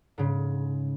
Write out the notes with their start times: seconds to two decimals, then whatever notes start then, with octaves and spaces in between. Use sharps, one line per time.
0.18 G#2 C#3